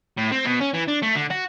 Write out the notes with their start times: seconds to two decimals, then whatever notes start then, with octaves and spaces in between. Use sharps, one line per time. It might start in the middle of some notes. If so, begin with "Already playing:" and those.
0.18 A2
0.32 C4
0.45 B2
0.61 C#4
0.74 E3
0.88 D4
1.03 A3
1.15 D3
1.31 F#4